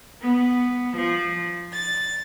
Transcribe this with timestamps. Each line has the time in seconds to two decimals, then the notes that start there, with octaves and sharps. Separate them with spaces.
0.21 B3
0.97 F3
1.72 A6